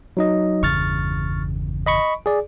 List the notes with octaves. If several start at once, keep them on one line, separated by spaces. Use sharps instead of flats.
F#3 D#4 D#5
G1 E2 C#3 C#6 F6 A6
D#5 B5 C#6
G#4 D5